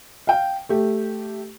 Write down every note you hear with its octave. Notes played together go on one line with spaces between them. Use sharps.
F5 G5
A3 G4